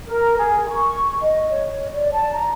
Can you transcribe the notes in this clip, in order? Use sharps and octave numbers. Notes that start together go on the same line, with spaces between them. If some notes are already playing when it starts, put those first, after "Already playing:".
A#4
G#4
C#6
D#5
C#5
D5
A5
A#5